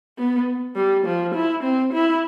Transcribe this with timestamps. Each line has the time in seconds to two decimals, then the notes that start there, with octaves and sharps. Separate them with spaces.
0.18 B3
0.76 G3
1.06 F3
1.34 E4
1.63 C4
1.93 E4